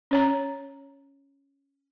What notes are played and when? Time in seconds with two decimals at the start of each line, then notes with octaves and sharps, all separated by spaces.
0.11 C#4 C#5 A#5